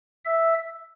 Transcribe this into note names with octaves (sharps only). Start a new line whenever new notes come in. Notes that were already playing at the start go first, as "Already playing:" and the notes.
E5 E6